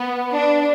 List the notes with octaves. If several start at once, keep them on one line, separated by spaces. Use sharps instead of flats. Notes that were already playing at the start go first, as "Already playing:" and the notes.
Already playing: B3
D4